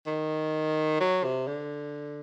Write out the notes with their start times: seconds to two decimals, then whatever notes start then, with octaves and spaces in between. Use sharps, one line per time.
0.07 D#3
1.00 F#3
1.24 C3
1.47 D3